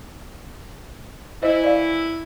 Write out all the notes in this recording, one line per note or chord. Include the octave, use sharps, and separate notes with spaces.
E3 E4 C5 D#5
D5 F5